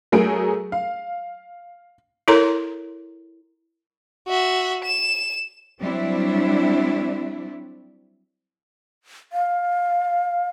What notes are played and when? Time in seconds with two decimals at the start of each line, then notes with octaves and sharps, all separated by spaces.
0.12 F#3 A3 G#4 A#4 D7
0.72 F5
2.28 E4 A4 A#4 C#5 A#5 C6
4.28 F#4 E5
4.84 E7
5.80 F#3 G3 C4 D4 E4
9.33 F5